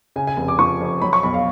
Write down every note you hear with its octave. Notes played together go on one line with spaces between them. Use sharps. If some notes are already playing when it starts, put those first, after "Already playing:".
C#3 G#5
G#5
F1
D6
F3 C#6
F2
F#3 B5
C#6
B1 B5
F5